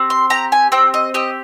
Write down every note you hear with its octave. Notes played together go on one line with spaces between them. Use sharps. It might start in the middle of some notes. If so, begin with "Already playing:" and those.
Already playing: C4 G4
C6
G4 A#5
G#5
C4 G5
D#5
G4 D#5